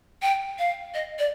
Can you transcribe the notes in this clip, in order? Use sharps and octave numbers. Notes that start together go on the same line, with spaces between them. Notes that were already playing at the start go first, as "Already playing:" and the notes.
G5
F5
D#5
D5